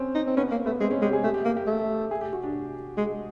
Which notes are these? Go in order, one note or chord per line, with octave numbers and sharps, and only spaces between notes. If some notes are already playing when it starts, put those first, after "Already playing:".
Already playing: C4 C#4
D#4
C4
B3 C#4
A#3
A3 B3
G#3 C4
C#4
G#3 G4
G#4
A3 G4
G4
A#3 G4
G4
A3
G#4
G4
F#4
D4
G#3